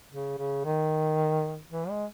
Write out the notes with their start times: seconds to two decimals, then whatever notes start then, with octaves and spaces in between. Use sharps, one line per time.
0.11 C#3
0.38 C#3
0.65 D#3
1.70 E3
1.89 G#3